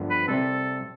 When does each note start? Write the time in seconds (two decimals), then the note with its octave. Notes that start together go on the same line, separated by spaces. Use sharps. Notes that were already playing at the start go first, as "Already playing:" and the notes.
Already playing: G2 D3 F3 B3
0.10 B4
0.28 C3 G3 C4 A4